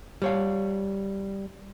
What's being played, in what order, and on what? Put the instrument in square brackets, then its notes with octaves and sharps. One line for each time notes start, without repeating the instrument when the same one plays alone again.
[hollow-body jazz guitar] G3 C#5 F5